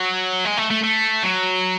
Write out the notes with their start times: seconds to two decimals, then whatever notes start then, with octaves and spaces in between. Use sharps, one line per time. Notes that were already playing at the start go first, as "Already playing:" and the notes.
Already playing: F#3
0.45 G#3
0.57 A3
0.70 A3
0.84 A3
1.23 F#3